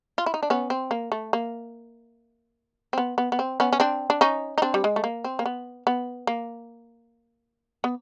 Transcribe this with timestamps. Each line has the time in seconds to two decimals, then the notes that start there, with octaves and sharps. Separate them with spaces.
0.18 F4
0.26 E4
0.34 D#4
0.43 D4
0.50 B3 C#4
0.70 C4
0.91 A#3
1.12 A3
1.33 A#3
2.93 C4
2.98 B3
3.18 B3
3.32 B3
3.39 C4
3.60 B3 C#4
3.73 C#4
3.80 C4 D4
4.10 D4
4.21 C#4 D#4
4.58 D#4
4.62 C4 D4
4.74 G3
4.84 G#3
4.96 A3
5.04 A#3
5.24 C4
5.39 A#3
5.46 B3
5.87 B3
6.27 A#3
7.84 B3